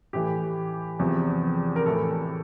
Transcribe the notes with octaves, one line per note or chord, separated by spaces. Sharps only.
A2 E3 G4
E2 C3 F3
A#4
A2 E3 A4